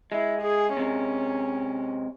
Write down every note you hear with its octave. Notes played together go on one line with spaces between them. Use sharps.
G#3 E4
G#4
C3 G#3 C#4